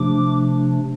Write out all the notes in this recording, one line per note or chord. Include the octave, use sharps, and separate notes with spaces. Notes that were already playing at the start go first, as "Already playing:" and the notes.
Already playing: C3 F3 A3 D4 D6